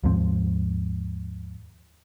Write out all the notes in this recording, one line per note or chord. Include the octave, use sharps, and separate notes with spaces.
D#2 G#2 F3 C4